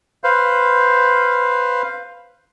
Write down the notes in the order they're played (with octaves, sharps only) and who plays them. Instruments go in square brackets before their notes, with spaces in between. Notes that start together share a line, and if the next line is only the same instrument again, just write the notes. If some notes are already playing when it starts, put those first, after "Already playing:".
[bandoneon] B4 C5 F5